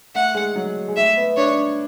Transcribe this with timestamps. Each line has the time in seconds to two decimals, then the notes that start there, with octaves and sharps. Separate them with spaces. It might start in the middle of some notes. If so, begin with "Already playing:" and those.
0.15 A3 F#5
0.35 G#3
0.56 F#3
0.88 G#3
0.96 A3 E5
1.17 B3
1.37 D4 C#5